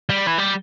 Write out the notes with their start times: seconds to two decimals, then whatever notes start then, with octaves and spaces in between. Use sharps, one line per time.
0.10 G3
0.27 E3
0.38 G3